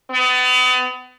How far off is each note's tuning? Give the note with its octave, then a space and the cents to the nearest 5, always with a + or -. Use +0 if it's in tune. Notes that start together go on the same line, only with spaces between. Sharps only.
B3 +35